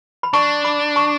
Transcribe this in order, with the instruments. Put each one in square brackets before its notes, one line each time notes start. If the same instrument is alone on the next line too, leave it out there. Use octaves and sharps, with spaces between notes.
[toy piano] B5
[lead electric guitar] D4 [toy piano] A5 C#6
[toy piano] B5 D6
A5 C#6